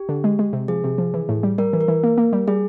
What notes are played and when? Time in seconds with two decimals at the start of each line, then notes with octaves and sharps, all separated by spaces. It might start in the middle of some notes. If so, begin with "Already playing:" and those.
Already playing: G4
0.09 D3
0.24 G#3
0.39 G#3
0.53 C3
0.68 F3 G#4
0.84 C3
0.98 F3
1.14 E3
1.29 A2
1.43 G3
1.58 G3 A#4
1.73 E3
1.81 A#4
1.88 E3
2.03 A#3
2.18 A#3
2.33 G3
2.48 G3 G#4